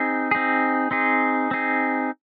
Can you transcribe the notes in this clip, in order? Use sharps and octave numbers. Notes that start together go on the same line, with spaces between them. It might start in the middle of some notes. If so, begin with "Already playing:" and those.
Already playing: C4 D#4 G#4
C4 D#4 G#4
C4 D#4 G#4
C4 D#4 G#4